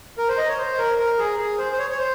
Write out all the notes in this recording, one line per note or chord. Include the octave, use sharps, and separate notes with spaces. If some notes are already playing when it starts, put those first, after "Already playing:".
A#4
C5
D#5
C#5
C5
A#4
A#4
G#4
G#4
C5
C5
C#5
C#5
C5